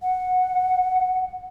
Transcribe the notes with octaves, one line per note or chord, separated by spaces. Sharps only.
F#5